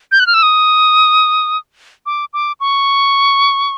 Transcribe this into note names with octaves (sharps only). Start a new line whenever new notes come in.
G6
F#6
F6
E6
D#6
D6
D6
C#6